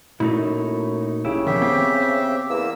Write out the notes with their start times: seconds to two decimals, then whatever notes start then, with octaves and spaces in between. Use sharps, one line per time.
0.20 F#2 A#2 A3 D#4 E4
1.25 F#1 C#3 E4 G4
1.47 F2 B2 D#3 G4 E5
1.62 B3 C4
2.50 E2 A#3 E6